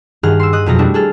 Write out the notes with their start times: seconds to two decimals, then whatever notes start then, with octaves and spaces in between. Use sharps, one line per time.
0.23 G2 D#3 G#4 F#5 F6
0.39 C6 E6
0.53 D#5 D#6 F#6
0.66 F2 B2 F#3 F5 A#6
0.79 G3 A3 D4 E4 F#4
0.94 G#4 A4 F6